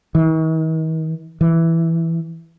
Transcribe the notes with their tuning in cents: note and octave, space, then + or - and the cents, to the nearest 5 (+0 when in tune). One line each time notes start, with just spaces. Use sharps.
D#3 +45
E3 +0